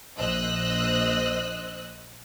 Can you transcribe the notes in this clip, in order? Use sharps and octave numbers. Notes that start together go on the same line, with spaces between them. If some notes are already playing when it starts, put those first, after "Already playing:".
A#1 C5 D#5 E6 F#6